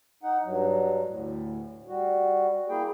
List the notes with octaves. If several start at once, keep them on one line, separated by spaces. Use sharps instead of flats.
D#4 F#5
G2 F#3
D2 A2
G3 F#4
A#3 E4 G#4 G5